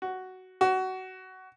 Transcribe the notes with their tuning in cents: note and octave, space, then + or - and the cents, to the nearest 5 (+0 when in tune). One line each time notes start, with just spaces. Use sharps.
F#4 +10
F#4 +20